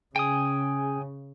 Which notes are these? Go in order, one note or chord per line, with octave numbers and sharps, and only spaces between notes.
C#3 G#4 G5 G#5 D#6